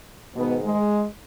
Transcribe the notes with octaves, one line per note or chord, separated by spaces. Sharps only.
G#2 B2 D#3 B3
G#3